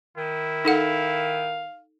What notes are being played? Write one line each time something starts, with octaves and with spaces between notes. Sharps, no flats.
D#3 E4
D#4 A4 F5 F#5